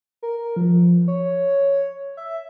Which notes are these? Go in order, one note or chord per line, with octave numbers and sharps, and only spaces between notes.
A#4
F3
C#5
E5